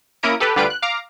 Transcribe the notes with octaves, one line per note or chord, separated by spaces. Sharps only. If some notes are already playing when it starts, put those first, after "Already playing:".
A#3 C#4 E4 A#4 D#6 D7
G4 A4 B4
D2 D3 G3 F4 B4 D7
F#6
F5 A#5 D6